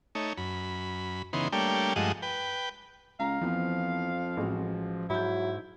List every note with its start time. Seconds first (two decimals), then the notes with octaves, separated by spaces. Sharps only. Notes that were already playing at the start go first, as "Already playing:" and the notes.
0.15 A3 D#4 C#5
0.38 F#2 B5
1.33 C#3 E3 B3 D#4 C6
1.53 G3 A3 A#3 D4 C#5 G5
1.96 G2 F3 G#3 A3 D#5 F#5
2.22 B4 G5
3.20 C#2 F5 A#5
3.41 F2 E3 F3 B3
4.37 A1 G#3 F#4
5.10 G#2 F#3 E4 B5 G6